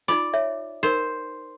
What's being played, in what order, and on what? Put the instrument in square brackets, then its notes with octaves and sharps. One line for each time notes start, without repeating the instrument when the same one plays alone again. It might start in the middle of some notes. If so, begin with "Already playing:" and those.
[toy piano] D#4 F4 B5 [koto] D5
[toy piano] C#5 E5
[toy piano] D#4 A#4 [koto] C5